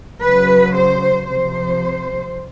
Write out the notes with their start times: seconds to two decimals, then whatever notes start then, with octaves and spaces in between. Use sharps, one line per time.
0.21 C#3 F#3 B4
0.74 C5
1.28 C3 F3 C5